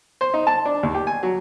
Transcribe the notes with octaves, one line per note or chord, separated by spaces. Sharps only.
C5
D#4
A5
D4
D#2
G4
G#5
F#3